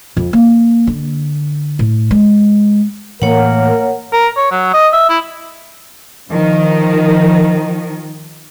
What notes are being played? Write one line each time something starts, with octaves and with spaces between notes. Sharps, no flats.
F2
A#3
D3
A2
G#3
A2 E3 A3 A#3 A#4 C#5 F#5
A#4
C#5
F#3
D#5
E5
E4
D#3 F3